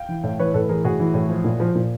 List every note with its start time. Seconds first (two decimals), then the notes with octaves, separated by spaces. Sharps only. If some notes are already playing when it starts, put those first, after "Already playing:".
Already playing: F5 G5
0.09 E3
0.24 A2
0.39 E3 B4 C#5
0.54 A2 A4 B4
0.69 E3 G#4 A#4
0.84 A2 F#4 G#4
0.99 E3
1.14 A2
1.29 F3
1.44 A#2
1.60 F3
1.75 A#2